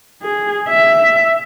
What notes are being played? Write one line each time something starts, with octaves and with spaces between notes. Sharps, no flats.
G#4
E5